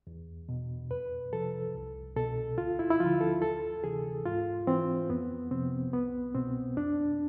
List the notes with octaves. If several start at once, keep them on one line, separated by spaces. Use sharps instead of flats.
E2
B2
F2 B4
C3 F3 A4
C2
B2 A4
D2 F4
E4
E4
D3 F3 F4
A4
D2 A4
C3 E3 G#4
G#2 F4
E3 C4
F2 B3
C3 F3 C4
C2 B3
B2 C4
F2 D4